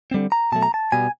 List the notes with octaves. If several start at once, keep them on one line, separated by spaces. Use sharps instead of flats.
D3 G3 C4
A#5
B2 F#3 A3 A5
A#5
A5
B2 G3 B3 G#5